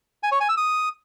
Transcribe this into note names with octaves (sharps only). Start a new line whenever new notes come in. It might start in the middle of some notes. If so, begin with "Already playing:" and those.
G#5
C#5
G#5
E6
D#6